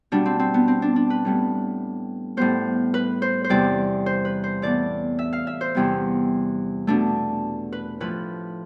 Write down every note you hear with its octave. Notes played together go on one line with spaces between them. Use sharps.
B2 G3 B3 D4
C4
C4
B3
C4
D4
D4
B4
A2 G3 B3
A2 G3 B3 C5
B4
C5
C5
E2 C3 G3 D5
C5
B4
C5
A2 E3 B3 D5
E5
F5
E5
C5
E2 C3 G3 B3
B2 A3 D4
B4
A2 F3 A3 B4